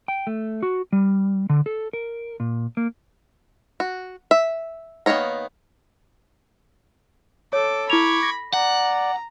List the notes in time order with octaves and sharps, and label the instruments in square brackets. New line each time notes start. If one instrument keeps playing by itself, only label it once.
[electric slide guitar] G5
A3
F#4
G3
D3
A4
A#4
A#2
A#3
[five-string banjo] F#4
E5
D#3 A#3 B3 C#5 A#5
[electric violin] A4 D6 [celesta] C#5
[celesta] E4 F7 [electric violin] B5 [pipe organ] C#6 D6 G#6
[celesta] A#6
[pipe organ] D5 [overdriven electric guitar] F#5 [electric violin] A#5